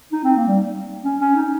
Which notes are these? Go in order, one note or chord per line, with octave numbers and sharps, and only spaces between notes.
D#4
C4
A#3
G3
C#4
C#4
D#4